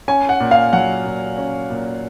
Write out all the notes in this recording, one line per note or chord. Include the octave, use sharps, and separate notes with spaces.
C#4 G#5
F#5
A#2
F5
F#3 F#5
A#2
C#4
A#2